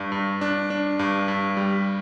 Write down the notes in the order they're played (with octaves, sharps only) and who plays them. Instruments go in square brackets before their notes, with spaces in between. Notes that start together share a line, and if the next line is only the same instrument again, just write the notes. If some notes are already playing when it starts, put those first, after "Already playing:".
Already playing: [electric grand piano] G2 D4
G2
D4
D4
G2
G2
G3